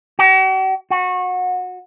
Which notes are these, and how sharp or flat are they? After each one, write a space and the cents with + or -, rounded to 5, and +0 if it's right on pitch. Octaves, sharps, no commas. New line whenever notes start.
F#4 +45
F#4 -25